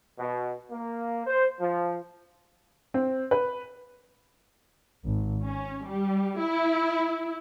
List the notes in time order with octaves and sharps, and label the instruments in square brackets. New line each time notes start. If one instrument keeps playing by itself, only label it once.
[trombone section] B2
A#3
C5
F3
[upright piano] C4
B4
[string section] G#1
C#4
G3
E4